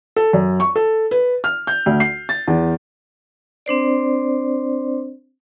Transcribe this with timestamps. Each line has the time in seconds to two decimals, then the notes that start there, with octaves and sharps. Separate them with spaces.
0.16 A4
0.33 F#2
0.60 C#6
0.76 A4
1.11 B4
1.44 F6
1.67 G6
1.86 D2
2.00 C7
2.29 A6
2.47 E2
3.66 C4 D4 C5 D5